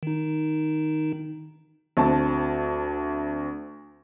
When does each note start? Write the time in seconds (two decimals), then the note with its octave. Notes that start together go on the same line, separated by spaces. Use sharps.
0.03 D#3 D#4
1.97 D2 C4 A5